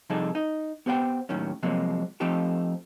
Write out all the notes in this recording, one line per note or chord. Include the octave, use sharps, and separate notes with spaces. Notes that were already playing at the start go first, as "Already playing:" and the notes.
C3 F3 G3 D#4 G#4 A4
D#4 D#5
B3 G4 C5 F#5 G5
D#2 A2 D#3 F#3 C#4
C3 F3 F#3 G#3 A#3 C4
F3 A3 C4 D#4 G4 A4